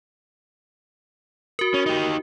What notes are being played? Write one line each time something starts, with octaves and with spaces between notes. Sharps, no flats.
F#4 A#4
C#4
D#4 G4